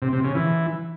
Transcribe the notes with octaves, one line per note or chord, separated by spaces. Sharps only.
C3
C3
C#3
E3